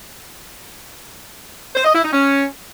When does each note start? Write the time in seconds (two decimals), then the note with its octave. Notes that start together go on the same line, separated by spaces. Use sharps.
1.76 C5
1.85 D#5
1.94 E4
2.03 D#4
2.13 C#4